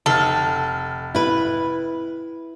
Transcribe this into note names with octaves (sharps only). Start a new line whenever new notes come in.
F1 A4 F6
E4 B4